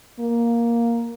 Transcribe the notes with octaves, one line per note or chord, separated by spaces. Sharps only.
A#3